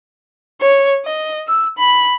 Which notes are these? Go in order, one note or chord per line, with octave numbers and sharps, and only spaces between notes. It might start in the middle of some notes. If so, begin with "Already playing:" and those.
C#5
D#5
E6
B5